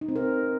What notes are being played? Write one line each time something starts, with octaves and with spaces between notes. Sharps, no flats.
D#4
C4
A#4